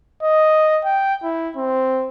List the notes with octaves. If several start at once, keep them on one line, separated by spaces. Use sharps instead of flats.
D#5
G5
E4
C4